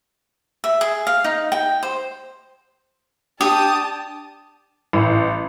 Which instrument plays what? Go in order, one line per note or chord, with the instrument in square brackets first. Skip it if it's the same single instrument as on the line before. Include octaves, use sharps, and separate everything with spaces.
[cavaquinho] E5
G#4
F5
D#4
G5
C5
[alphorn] D4 [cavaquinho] G4 [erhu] A5 [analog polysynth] D#6
[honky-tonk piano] A1